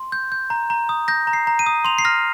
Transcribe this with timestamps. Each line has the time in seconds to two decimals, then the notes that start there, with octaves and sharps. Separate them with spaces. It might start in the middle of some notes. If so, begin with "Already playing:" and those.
Already playing: C6
0.12 G6
0.32 G6
0.50 A#5
0.70 A#5
0.89 D#6
1.08 G6 A#6
1.27 A#5
1.33 C7
1.47 A#5
1.59 D#7
1.66 D#6
1.85 C6 F7
1.98 C7
2.05 F6 A#6